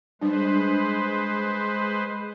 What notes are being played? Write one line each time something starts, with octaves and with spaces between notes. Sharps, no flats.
G3 G#3 D4 B4 C5